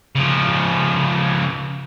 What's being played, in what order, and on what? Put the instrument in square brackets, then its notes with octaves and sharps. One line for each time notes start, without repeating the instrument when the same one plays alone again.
[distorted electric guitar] C#3 F3